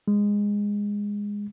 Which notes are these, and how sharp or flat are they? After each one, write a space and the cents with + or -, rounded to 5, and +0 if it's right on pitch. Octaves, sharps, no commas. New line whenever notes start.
G#3 -15